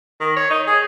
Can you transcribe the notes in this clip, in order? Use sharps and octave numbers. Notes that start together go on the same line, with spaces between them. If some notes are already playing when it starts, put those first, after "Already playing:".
D#3
C#5
D#4
G#4